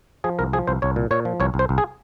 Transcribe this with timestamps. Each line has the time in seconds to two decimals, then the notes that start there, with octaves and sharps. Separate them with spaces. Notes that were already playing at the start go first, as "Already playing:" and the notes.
0.24 F3 G#4
0.39 C2 A#4
0.53 F3 G#4
0.67 C2 C5
0.82 C2 C#5
0.96 A#2
1.11 A#2 C#5
1.25 F3
1.40 C2 C#5
1.54 C2
1.59 C5
1.69 C2
1.78 G#4